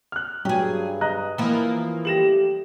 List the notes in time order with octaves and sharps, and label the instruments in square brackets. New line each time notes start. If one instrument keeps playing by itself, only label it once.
[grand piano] F6 F#6
[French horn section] G2 [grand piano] F#3 [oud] G4 G#4
[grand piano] D#5 A#5 F#6
[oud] E3 F3 A#3
[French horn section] G3 A3 G4 [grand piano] A#6 E7 F#7